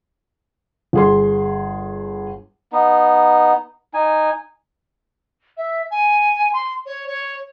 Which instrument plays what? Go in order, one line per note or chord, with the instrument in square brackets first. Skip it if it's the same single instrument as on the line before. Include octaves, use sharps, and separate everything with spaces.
[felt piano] G1 G#4 C6
[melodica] B3 D#4
D#4 G#5
[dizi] E5
G#5
C6
C#5
C#5